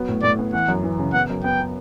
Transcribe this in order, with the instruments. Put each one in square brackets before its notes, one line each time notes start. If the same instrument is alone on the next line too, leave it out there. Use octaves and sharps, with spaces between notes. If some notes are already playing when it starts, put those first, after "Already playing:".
Already playing: [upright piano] F#3 B3
A2
[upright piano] A2 [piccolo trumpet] D5
[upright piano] B3
[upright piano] E3 [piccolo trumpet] F#5
[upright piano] F#2
E3
C#3
[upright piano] B3 [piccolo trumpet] F#5
[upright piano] F#2
[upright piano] B3 [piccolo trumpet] G5
[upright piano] B3